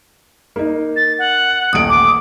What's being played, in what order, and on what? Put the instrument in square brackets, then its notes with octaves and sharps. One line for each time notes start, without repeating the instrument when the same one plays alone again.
[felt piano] A#3 D#4
[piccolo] A6
F#5
[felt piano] D#1 A1 D7 [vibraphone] D#6
[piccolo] D6